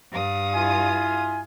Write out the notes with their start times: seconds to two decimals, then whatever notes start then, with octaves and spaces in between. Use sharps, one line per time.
0.12 G2 F5 D#6
0.54 E4 F4 G#5